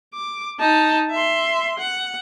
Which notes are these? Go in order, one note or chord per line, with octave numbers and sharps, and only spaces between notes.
D6
D#4 A5
E5 C6
F#5